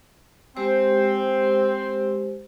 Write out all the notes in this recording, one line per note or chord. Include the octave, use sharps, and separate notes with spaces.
G#3 C4 G4 C5